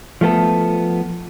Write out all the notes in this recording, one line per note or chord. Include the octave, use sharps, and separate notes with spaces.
F3 A3 B3 A4